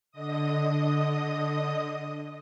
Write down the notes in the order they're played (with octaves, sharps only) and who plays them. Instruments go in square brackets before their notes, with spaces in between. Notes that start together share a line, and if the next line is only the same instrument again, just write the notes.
[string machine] D3 D#5 D#6